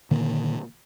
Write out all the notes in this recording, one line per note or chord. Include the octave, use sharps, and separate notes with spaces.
A#2 D3 D#3 A#3